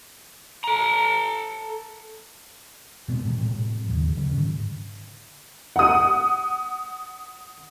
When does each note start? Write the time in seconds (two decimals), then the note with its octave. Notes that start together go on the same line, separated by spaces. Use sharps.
0.64 A4 A#5
3.08 B2 G#3 B3 C4
3.24 A2 E3
3.40 A2 C3 G3 G#3
3.86 D#2 C#3 F3
4.16 C#3 F#3 G3 C#4
4.33 G#2 D3 D#3
5.76 F#5 D#6